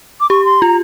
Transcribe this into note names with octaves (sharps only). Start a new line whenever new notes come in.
D6
G4 C#6
C6
F4 A#5